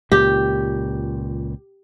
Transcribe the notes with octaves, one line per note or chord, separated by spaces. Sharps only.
C#2 A#2 G4